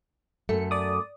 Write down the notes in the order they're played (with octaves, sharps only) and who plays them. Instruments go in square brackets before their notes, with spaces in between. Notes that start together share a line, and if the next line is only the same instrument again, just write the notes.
[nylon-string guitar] F#2 A3 [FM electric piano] C#7
[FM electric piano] D5 D#6